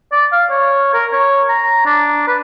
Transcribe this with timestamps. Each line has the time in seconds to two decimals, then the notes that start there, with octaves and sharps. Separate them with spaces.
0.12 D5
0.32 F5
0.50 C#5
0.94 A#4
1.12 C#5
1.49 A#5
1.86 D4
2.27 B4